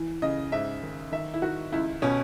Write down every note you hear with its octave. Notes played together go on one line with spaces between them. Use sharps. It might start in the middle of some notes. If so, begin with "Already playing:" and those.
Already playing: E3
C#3 D#5
G#2 E5
D#3
D#3 E5
E4
D#3 F#4
C#2 E4
B2 C#4